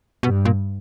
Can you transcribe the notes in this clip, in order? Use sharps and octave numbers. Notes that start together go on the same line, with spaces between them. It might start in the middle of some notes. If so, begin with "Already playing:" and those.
G2 B2
A#2